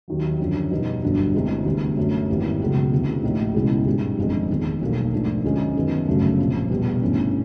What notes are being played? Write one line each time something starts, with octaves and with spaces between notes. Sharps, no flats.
D#2 D#3 F#3
F#2 D3 F3
E2 B2 G3 B3 D#4
G1 G2 D3 F#3 B3
D2 C3 E3 G#3
D2 D3 G3 B3
F#2 D3 F#3 A3
G#1 G2 E3 G3 A#3
C#2 B2 F#3
D2 C3 E3
A1 A2 F3 A#3 D#4
C#2 B2 G#3 C#4 E4
G#2 E3 G3
G1 F2 D3 F3 G#3
F1 E2 C3 D#3
B1 B2 G3 A#3
G#2 F3 A3 D4
D2 D3 F3 G#3 C#4
F#2 D#3 G#3 B3
G1 F#2 C#3 F#3 A3
C2 A#2 F3
E2 B2 G3 B3
G1 G2 E3 A3 C#4